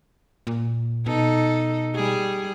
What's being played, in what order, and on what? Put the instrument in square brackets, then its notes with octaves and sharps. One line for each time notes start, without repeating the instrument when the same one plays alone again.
[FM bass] A#2
[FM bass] B2 [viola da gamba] D#4 A4
[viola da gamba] G3 G#4